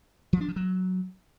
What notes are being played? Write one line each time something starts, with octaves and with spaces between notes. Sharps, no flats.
F3
D4
F3
F#3